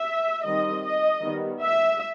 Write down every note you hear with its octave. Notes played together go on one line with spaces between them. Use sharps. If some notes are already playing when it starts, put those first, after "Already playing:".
Already playing: E5
D#3 G3 C4 D#5
D#5
D#3 G3 B3
E5